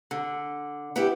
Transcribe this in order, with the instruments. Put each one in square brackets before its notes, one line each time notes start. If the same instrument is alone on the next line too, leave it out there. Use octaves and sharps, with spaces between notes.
[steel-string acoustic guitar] D3
B3 E4 G4